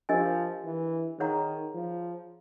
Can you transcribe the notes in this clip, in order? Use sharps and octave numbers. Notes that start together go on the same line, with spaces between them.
F3 D4 G4 A#4 D#5 G#5
E3
D#3 G#4 C#5 F#5 A#5
F3